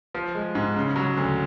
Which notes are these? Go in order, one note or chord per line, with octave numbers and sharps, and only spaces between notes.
F3
G#3
G#2
C#3
F#3
D2